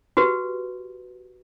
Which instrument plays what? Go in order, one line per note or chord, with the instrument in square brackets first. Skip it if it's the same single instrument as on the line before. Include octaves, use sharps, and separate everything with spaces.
[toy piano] F#4 G4 B4